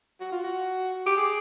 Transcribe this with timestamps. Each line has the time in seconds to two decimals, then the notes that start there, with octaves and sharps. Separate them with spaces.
0.21 F#4
0.32 F4
0.44 F#4
1.06 G4
1.17 G#4